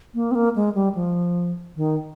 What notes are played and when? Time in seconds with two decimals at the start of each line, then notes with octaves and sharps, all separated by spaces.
0.15 A#3
0.31 C4
0.35 A#3
0.56 G#3
0.75 G3
0.95 F3
1.76 D#3